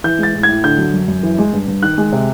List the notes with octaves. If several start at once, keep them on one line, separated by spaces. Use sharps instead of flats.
E3 G6
G#3 A6
A2
G#6
A2
D3 G6
F#3
F#2
F#2
E3
G#3
G2
G2
D#3 F#6
G#3
C3